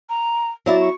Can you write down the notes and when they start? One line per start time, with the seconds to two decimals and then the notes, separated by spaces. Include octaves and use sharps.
0.09 A#5
0.66 F#3 E4 D5 E5
0.80 C#6